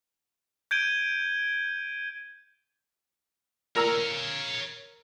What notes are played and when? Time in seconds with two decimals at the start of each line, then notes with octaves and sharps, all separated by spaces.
0.71 G6 G#6 D7 D#7 G7
3.76 A#4 C#5 F5 A#5 E6